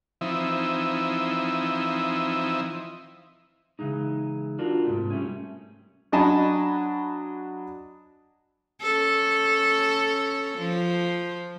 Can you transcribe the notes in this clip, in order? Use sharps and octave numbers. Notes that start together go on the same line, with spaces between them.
E3 F3 C4 D#4 E4
C#3 E3 G#3 D#4
D4 F4 F#4 A#4
G#2 C3 A3
G3 A3 C#4
F#3 D4 D#5 G#5 A5 B5
C#4 A4
F3